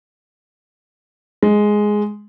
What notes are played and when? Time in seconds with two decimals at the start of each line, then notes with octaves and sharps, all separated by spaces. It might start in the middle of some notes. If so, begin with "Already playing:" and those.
1.43 G#3